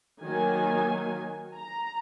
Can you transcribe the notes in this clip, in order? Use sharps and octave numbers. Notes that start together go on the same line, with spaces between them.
D#3 F#3 A#3 G#5
A#5